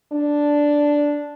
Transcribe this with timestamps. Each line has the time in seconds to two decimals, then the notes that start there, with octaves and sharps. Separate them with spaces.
0.13 D4